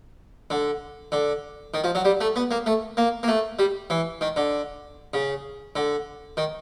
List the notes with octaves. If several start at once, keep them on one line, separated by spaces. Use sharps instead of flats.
D3
D3
D#3
F3
F#3
G3
A3
B3
A#3
A3
A#3
A#3
A3
G3
E3
D#3
D3
C#3
D3
D#3